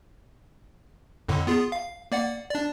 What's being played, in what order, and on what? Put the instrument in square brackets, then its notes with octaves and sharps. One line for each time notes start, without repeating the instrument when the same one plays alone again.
[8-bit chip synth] F2 A2 D3
B3 F4 G#4
F5
A#3 D5 F#5
D4 D5